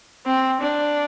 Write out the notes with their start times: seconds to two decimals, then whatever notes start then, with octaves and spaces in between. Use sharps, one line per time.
0.26 C4
0.60 D4